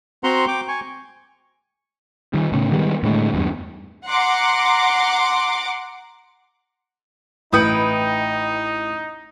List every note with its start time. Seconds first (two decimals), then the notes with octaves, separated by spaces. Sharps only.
0.24 C4 F#4 F#5 A#5 C6
0.48 G5 D6
0.68 G#5 C#6
2.34 D#3 G3
2.52 A2 C#3
2.72 D#3 G3 G#3 B3
3.03 A2 D3 G#3
3.34 E2 G2
4.07 F#5 A#5 C6 D6
7.53 A1 D#4 E4 B4 G5 D#6 C#7